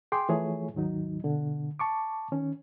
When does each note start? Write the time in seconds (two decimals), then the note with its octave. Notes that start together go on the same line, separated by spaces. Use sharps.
0.12 G#4 G5 C6 D6
0.29 E3 F3 A3 E4 G#4 C#5
0.74 D#2 G#2 D#3 F#3 D#4
1.24 B2 D3
1.79 A5 C#6 D6
2.32 D#3 C#4